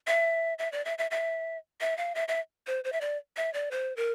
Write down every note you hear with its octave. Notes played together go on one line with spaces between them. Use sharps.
E5
E5
D5
E5
E5
E5
E5
F5
E5
E5
C5
C5
E5
D5
E5
D5
C5
A#4